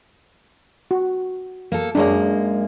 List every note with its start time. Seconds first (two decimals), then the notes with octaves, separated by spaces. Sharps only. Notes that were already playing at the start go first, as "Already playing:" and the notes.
0.91 F#4
1.72 A#3 A4
1.95 F#2 G#3 A#3 D4 C#5